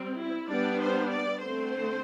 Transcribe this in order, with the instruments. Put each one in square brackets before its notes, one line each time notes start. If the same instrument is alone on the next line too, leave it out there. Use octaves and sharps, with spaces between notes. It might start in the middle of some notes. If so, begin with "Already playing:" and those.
Already playing: [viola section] G3 C4
E4
G3 B3 D4 D5
C5
D5
D3 A3 C4 C5